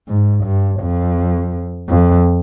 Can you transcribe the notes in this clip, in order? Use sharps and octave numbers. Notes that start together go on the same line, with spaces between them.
G#2
G2
F2
F2